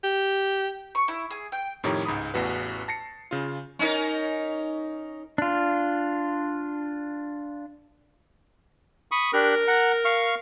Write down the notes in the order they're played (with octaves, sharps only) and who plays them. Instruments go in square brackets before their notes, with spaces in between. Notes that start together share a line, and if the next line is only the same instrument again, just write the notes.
[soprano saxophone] G4
[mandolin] C#6
E4
G#4
G5
[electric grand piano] F2 A2 D#3 G4 C#5 A#5
C#2 G#2 A#5 B5 D#6
A1 E2 F#4 B4
A5 A#6 C7 C#7
C#3 F4
[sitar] C#4 D#4 A#4
[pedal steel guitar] D4 F4
[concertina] B5 C#6 D#6
[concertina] D4 G4 F#6 [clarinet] A#4
[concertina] F#5 A#5
F5 C#6 F6